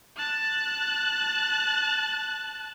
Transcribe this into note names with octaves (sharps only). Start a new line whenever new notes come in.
A5 F#6